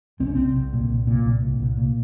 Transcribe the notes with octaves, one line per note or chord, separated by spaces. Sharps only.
C2 C4
C#4
C2 C4
C2
A#2
C2
A#2
C2
A#2
C2
A#2